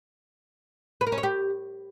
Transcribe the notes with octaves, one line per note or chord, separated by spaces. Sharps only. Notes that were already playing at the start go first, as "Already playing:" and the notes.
B4
A#4
C#4
C#5
G4